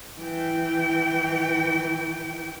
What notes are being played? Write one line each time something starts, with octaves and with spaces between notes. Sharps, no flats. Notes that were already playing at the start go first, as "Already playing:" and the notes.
E3 G5